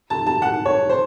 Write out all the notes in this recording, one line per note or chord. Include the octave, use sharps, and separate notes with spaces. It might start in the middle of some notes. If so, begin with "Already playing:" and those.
A5
A5
F#5
C#5
C5